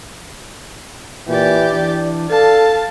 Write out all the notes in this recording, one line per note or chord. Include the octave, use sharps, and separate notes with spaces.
A#2 E3 G4 D5
E3 D4
A4 F5 A5